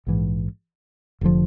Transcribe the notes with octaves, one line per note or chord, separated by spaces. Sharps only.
A#1 G#2 E3
F1 D3 F3